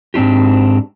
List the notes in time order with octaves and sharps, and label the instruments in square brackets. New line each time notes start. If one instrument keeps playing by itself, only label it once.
[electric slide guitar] G#2 C4 D4 F4 G4